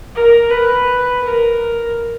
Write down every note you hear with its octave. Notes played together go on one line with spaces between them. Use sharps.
A#4
B4
A#4